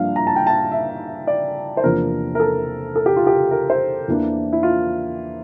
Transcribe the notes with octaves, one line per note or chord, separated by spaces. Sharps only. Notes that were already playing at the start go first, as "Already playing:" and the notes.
Already playing: G2 F3 A#3 D4 F5
A#5
A5
G5
A5
E5
D5
C5
E2 C3 F3 A#3 D4 A#4
A#4
A4
A4
G4
F4
G4
A#4
C5
E2 E3 A#3 D4
E4
F4